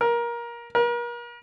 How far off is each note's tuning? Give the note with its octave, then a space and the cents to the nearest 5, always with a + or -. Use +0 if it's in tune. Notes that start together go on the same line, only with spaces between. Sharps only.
A#4 +20
A#4 +40